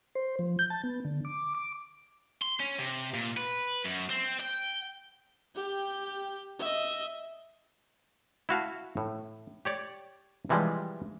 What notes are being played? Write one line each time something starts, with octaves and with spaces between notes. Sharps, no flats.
C5
F3
G6
A5
B3
D3
D6
D6
C6
C#4
C3
A#2
B4
F#2
C4
G5
G4 G5
D#5 E5
E4 F#4 F5 A5
A2
G4 C#5 D5
C3 E3 F3 G3 G#3